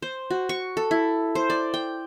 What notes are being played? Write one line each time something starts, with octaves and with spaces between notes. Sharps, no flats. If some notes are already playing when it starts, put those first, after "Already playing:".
C5
F#4
C#6
A4
E4
C5
D5
G5